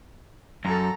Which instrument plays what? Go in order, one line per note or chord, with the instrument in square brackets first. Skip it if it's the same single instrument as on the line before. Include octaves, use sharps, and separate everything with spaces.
[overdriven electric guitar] F#2 [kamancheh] A4 A#5